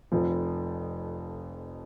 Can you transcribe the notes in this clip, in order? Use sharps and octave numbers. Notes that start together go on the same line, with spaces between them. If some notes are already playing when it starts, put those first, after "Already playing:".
F1 F2 F3